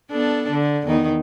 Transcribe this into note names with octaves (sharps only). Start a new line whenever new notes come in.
B3 D4 A4
D3
E2 D#3 D#4